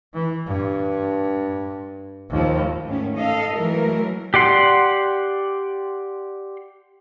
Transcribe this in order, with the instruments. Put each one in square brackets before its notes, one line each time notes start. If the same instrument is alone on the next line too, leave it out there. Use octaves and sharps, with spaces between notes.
[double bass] E3
G2
D#2 F3
[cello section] G#2 D#3 A3 C#4
A4 D#5 F5
E3 F#3 G#3 A3 A#4
[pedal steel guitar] G4 D5 F#5 C6